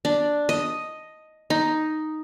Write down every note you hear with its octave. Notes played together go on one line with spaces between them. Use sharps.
D4
D#5
D#4